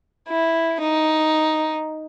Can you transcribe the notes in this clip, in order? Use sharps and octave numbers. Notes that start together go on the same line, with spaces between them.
E4
D#4